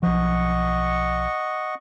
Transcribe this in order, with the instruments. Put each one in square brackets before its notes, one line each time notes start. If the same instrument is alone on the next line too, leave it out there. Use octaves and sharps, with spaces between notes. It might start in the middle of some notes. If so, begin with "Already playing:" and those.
[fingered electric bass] B1 F3 [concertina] D#5 F#5 C#6